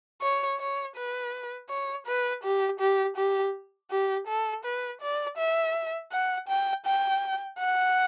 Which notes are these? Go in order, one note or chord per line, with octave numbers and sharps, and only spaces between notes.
C#5
C#5
B4
C#5
B4
G4
G4
G4
G4
A4
B4
D5
E5
F#5
G5
G5
F#5